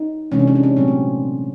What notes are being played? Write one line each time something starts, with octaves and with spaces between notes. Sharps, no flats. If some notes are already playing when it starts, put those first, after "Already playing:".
Already playing: D#4
C3 E3 G#3 C#4
D4
C#4
D4
C#4
A#2 F#3 A3 C4
C4